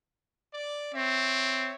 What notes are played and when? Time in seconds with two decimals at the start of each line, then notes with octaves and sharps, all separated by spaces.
0.54 D5
0.95 C4 C#5 E5